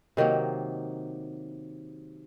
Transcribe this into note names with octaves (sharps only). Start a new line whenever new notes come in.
C3 D#3 F#3 A#3